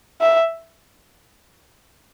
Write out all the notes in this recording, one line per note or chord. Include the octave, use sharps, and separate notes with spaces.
E5